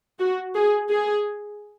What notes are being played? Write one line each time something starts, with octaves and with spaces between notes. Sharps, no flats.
F#4
G#4
G#4